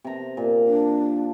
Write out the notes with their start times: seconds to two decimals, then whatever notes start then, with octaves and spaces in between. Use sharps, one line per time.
0.04 C3 A#5
0.37 A#2
0.67 D4